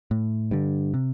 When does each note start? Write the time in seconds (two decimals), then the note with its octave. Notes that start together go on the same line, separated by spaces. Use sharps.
0.11 A2
0.51 G2 D3
0.94 C3